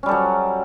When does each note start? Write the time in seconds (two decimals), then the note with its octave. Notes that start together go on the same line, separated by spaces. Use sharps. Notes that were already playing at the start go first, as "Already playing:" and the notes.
0.03 C#4
0.06 G3
0.09 A4
0.11 F#3